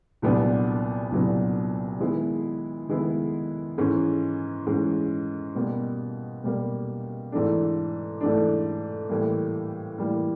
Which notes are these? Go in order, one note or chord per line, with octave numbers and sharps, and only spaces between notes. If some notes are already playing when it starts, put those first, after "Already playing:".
C2 A#2 F#3 B3 D4
C2 A#2 F#3 B3 D4
D#3 G#3 B3 E4
D#3 G#3 B3 E4
G#2 E3 G#3 C#4
G#2 E3 G#3 C#4
B2 G3 A#3
B2 G3 A#3
G#2 E3 A3 D4
G#2 E3 A3 D4
A2 E3 G3 A#3
A2 E3 G3 A#3